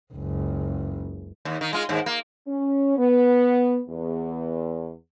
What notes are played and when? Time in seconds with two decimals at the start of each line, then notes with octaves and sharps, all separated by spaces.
0.14 F#1 C#2
1.45 D#2
1.61 D#3
1.73 G#3 F4
1.89 D#2 G#2
2.06 A#3
2.48 C#4
2.96 B3
3.88 E2